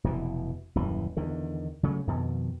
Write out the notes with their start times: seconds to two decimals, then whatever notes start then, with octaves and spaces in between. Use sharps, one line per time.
0.04 F1 B2 E3
0.75 D#1 F#2 E3
1.17 E2 D3 D#3
1.83 C#3 F#3 A3
2.07 F2 B2 D#3